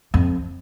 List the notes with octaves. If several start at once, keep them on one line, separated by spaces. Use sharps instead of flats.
F2